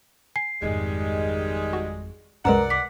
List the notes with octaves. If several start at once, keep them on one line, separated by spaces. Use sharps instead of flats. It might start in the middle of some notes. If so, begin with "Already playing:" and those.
G#5 C7
G#1 F2 D#3 G3 G#3
F#4
C2 F#2 G#3 A#4 B4 D5 F#5 A#5
D6 B6